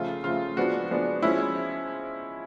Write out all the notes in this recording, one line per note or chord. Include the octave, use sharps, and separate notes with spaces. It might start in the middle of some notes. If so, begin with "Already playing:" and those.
Already playing: C#3 F3 A3 F4
C#3 F3 A3 F4
F3 G#3 B3 D4 F#4
F3 G#3 B3 D4
F3 G#3 C#4 E4